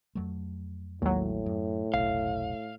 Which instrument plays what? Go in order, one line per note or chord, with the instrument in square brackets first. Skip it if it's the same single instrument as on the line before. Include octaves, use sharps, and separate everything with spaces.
[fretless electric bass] F2 F#3 A3
[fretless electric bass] A1 G#3 [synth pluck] D#2 F#3 [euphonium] A2
[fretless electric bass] F#2
[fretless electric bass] F1 B1 [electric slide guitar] F5